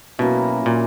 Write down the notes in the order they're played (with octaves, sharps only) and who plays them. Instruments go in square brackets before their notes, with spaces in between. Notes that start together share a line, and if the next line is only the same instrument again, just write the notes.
[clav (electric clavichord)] B2 [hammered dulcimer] F#3 A#3 C#4 E4
[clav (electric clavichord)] A#2